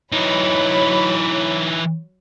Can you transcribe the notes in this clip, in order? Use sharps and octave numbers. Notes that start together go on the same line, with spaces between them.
E3 F#3 D#4 C#5 B5